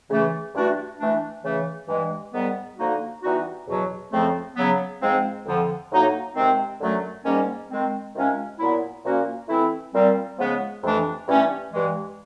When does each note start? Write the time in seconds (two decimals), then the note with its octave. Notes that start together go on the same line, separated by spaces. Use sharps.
0.08 C#3 E3 A3
0.53 G2 E3 A3 D4 F#4
0.98 E3 A3 D4
1.43 C#3 E3 A3
1.87 G2 E3 G#3
2.32 G#2 D#3 G3 B3
2.77 D3 F3 A#3 D#4 F#4
3.22 E3 G3 B3 D#4 F#4
3.66 E2 B2 F#3
4.11 F2 C#3 F3 A3 C4
4.55 C#3 F#3 B3
5.01 G#2 F3 G#3 C4
5.45 F2 D3 F3
5.90 A2 F#3 A#3 D#4 F#4
6.35 C3 D#3 G#3 C4
6.80 F#2 D3 F#3 A3
7.24 G#2 D#3 G3 A#3 C#4
7.69 D#3 G#3 C4
8.14 C3 D#3 G#3 C#4 F4
8.58 A#2 F#3 B3 E4
9.04 A#2 F3 A#3 C#4 F#4
9.48 E3 A3 C4 E4
9.93 A#2 G3 C4
10.38 C#3 F3 G#3 B3
10.82 F2 C3 E3 A3 D4
11.27 G2 E3 A3 C#4
11.71 G2 E3 G#3